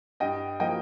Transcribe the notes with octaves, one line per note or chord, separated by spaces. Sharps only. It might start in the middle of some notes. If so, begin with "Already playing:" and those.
G2 D#5 G5
F3 A#3 D#5 G5